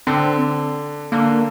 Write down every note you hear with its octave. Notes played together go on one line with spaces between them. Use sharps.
D3 C4
D3 A#3